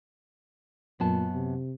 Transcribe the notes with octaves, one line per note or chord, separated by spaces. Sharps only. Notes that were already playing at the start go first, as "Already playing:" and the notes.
F#2 A#2 B3 A5
C3